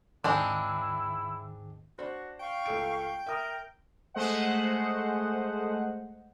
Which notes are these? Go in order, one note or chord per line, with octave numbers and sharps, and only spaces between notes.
D#2 G#2 D#3 G#3 C4 D4 E4
D4 F#4 C5
F5 G5 C#6
C#2 A4 D7
A#4 E5 D#6
G#3 A3 C5 D#5 F#5